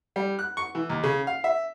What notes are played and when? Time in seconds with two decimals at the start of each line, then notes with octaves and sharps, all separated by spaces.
0.16 G3
0.39 F#6
0.57 C#6
0.75 E3
0.90 D#2
1.03 C#3
1.27 F5
1.44 E5